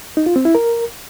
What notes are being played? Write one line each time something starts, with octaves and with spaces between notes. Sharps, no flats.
D#4
F4
C4
E4
A#4